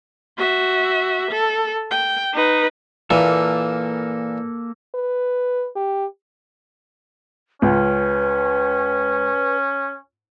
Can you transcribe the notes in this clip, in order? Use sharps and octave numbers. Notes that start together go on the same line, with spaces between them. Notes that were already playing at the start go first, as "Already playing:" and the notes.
F#4 E5
A4
G5
D#4 B4
A#2 E3 A#3 A4
B4
G4
C#2 C#4 B4